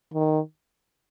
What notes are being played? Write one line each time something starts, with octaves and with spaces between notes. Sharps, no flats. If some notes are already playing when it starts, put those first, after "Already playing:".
D#3